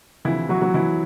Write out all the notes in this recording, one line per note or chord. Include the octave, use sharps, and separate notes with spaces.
D2 C3 E3 F3 E4
F#3 F#4
F#3 F#4
E3 E4